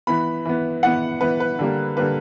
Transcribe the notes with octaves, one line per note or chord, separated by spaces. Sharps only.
E3 B3 B5
E3 B3
E3 B3 F#5
E3 B3 B4
B4
D3 G3 A#3
D3 G3 A#3 B4